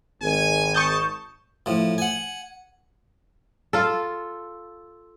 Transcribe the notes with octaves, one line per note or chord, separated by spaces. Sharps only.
G#1 G#5
A5 C#6 D#6 G6
A2 F3
F#5 G#5
F4 A4